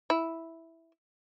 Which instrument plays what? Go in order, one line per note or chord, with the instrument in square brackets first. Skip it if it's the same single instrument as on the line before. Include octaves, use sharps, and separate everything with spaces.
[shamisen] E4